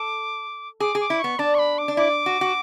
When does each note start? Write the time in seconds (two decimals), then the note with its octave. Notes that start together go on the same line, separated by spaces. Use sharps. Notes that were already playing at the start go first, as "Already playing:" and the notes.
Already playing: A4 D6
0.80 G#4 D6
0.95 G#4
1.01 D6
1.10 E4
1.19 B3 C#6
1.39 D4 A5
1.55 C#6
1.59 B5
1.78 D6
1.88 D4
1.97 E4 D6
2.26 F#4
2.41 F#4